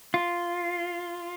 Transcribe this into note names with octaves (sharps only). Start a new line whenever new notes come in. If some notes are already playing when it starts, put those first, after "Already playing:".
F4